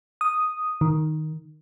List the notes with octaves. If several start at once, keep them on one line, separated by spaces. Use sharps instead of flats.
D#6
D#3